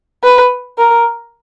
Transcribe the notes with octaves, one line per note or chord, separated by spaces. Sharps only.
B4
A#4